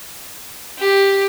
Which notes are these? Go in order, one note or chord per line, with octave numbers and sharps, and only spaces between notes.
G4